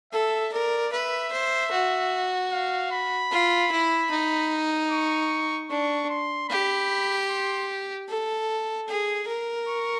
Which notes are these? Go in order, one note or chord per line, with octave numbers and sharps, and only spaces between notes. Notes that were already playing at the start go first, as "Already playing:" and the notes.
A4 E5
A#4 D5
B4 E5
C5
F#4
F5
B5
F4
E4
D#4
C#6
D4 C#6
C6
G4 B5
C6
A4
G#4
A#4
C#6